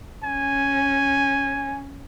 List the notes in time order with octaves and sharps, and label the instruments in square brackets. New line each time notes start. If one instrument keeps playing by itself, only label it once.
[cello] C#4 [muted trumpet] G#5